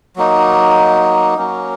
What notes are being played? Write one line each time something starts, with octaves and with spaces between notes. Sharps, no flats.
F#3 A#3 D#4
F#3 A#3 C#4